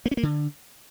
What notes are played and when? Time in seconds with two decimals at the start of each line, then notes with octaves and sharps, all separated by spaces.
0.06 A#3
0.11 C#4
0.17 A#3
0.23 D3